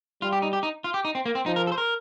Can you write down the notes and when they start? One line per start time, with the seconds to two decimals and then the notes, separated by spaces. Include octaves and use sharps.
0.22 G3 F4
0.33 G4
0.42 D#4
0.53 G4
0.63 D#4
0.84 F4
0.94 G4
1.05 D#4
1.15 C4
1.26 A#3
1.35 C4
1.46 F3 D#4
1.56 A#4
1.67 A4
1.72 C5
1.78 A#4